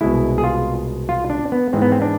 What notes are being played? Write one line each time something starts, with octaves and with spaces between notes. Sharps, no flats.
C2 B2 G#3 E4
G#4
F4
F4
D4
B3
G#2 E3 G#3 C4
B3
C4
D4